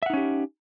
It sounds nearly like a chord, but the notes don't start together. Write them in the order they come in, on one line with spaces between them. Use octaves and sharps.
E5 F#5 D#4 C#4 G4